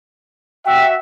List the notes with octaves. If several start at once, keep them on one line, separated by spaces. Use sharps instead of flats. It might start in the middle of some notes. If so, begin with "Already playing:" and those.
F#4 E5 G5